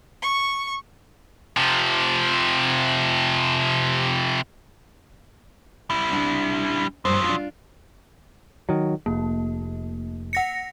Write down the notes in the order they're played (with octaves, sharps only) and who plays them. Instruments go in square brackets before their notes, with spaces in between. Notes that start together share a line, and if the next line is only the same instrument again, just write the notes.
[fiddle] C#6
[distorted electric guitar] C3 F3
[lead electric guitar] G3 E4
[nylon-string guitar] D4 E5
[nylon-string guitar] G2 C5 [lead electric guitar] F3 F#3
[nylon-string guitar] D4 F4
[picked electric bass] D#3 F#3
[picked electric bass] F1 [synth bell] A#3
[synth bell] F#5 A#6 C#7